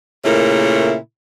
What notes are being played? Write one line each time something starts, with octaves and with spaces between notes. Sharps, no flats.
A#2 C#3 A3 E4 A#4